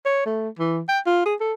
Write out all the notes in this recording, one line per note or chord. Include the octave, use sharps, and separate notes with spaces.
C#5
A3
E3
G5
F4
G#4
A4